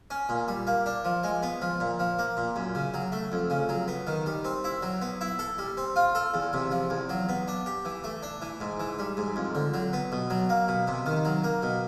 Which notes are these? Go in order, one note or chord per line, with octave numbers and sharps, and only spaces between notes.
C#4
A#2
G3
A#3
D4
F3
G#3
B3
F3
A#2
F3
A#3
A#2
F#2
C#3
F#3
A3
F2
C#3
F#3
B3
D#3
G3
C4
E4
F#3
B3
E4
A4
G3
C4
F4
A4
E2
C3
F3
E2
F#3
B3
D4
G4
E3
A3
D4
E3
G#2
E3
G3
G#2
F2
D3
F#3
B3
B2
F#3
A#3
B2
C3
D#3
F#3
A#3
B2